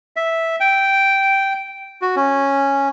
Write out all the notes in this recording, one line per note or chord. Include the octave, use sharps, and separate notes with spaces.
E5
G5
F#4
C#4